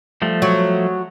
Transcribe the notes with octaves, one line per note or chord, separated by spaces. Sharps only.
F3 G3 A3
F#3